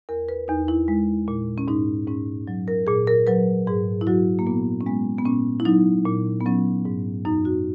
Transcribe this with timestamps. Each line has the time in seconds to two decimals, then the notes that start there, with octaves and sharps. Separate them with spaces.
0.09 E2 A#4
0.29 B4
0.48 E2 D#4
0.68 E4
0.88 G#3
1.28 A#2
1.58 C#4
1.68 G#2 D#4
2.08 G#2 C#4
2.48 F#3
2.68 A#4
2.87 A#2 G#4
3.07 A#4
3.27 F#3 B4
3.67 G#2 G#4
4.01 E4
4.07 F#3 F#4
4.39 A#3
4.47 A#2 B3
4.81 C#4
4.86 G#3 B3
5.18 B3
5.26 A#2 C#4
5.60 E4
5.65 F#3 D#4
6.06 A#2
6.40 B3
6.46 F#3 C#4
6.85 G#2
7.25 F#2 D#4
7.45 F#4